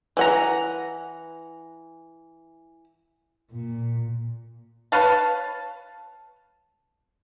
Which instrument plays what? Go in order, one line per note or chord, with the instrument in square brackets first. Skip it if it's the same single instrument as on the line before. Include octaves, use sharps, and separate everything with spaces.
[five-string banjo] E3 F#5 A#5
[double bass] A#2
[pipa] B4 C#5 F5 A5